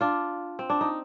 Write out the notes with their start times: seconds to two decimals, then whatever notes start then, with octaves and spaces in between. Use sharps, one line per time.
0.01 D4 F4
0.59 C4
0.70 D4
0.81 D#4